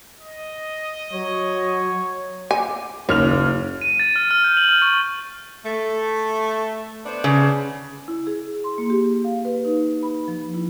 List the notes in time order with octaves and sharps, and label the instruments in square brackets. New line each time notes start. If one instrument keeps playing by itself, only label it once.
[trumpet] D#5
[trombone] F#3 [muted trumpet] C#5
[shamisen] G#5 [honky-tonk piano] D6
[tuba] F#1 [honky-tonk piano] D#2 F6 F7 [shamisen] C#5
[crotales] D#7
A6
F6
F6
G6
F#7
F6
C#6
[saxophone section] A3
B3 D4 C5
[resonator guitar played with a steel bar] C#3
[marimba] E4
G#4
C6
A#3
G4
F5
B4
D#4
B5
F3
E4